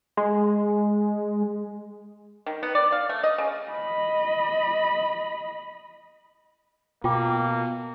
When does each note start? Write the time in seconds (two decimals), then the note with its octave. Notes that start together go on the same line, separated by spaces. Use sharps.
0.17 G#3
2.46 D#3
2.63 B3
2.75 D5
2.92 F5
3.09 A3
3.24 D#5
3.38 C#3
3.71 D#5 B5
7.04 B2 A#3 F4 G5 D6